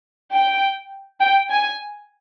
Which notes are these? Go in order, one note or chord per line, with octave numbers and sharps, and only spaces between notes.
G5
G5
G#5